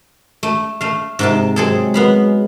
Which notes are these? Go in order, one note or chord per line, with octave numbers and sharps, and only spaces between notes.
A3
A3 F5
G#2 C3 A5
F#3 G#3 C4 G#4 A4
B3 F5 B5